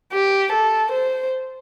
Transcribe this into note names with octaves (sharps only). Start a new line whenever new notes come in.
G4
A4
C5